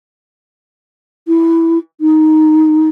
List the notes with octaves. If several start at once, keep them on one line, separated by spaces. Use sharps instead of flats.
E4
D#4